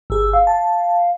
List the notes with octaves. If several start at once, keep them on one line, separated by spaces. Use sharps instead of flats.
G1 G#4 E6
F5
A5